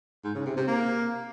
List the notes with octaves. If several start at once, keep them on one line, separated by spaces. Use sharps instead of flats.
G#2
C#3
C3
C3
A#3